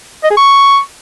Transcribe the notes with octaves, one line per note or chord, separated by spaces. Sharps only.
D#5
G#4
C#6